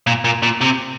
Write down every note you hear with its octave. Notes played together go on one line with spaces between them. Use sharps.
A#2
A#2
A#2
C3